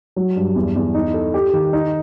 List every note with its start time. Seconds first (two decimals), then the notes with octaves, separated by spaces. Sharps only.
0.16 F#3
0.36 G2
0.56 E2
0.76 E2
0.95 D#4
1.14 A4
1.34 G4
1.53 D#3
1.73 D#4